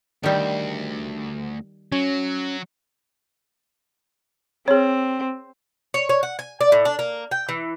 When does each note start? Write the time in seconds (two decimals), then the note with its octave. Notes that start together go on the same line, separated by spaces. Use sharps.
0.23 D2 D#3 G3
1.92 F#3 C#4
4.68 C4 G#4 C#5
5.94 C#5
6.09 C#5
6.23 F#5
6.39 G#5
6.61 D5
6.72 A2
6.85 D4
6.99 A#3
7.31 G5
7.49 E3